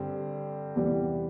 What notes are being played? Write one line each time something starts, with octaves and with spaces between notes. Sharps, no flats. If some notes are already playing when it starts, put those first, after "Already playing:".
Already playing: G2 D3 G3 C4
E2 C3 E3 G3